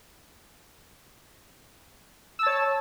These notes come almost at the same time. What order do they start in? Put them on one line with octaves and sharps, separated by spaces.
E6 A5 C#5